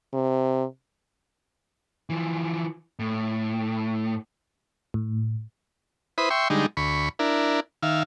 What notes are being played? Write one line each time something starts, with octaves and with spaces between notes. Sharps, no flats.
C3
E3 F3
A2
A2
E4 B4 C5 B5 D#6
E5 G5 C6 C#6
D3 G3 G#3 D#4
D2 B5 C#6
D4 E4 A#4
D#3 E5 F5